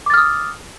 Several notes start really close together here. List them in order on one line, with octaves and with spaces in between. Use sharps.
D6 A6 F6 D#6